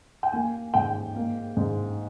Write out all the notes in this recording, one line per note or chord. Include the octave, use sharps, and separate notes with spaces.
G5
A#3 G#5
G#2 G5
A#3
G#2